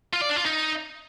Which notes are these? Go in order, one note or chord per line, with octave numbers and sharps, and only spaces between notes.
F4
D5
D4
F4
D#4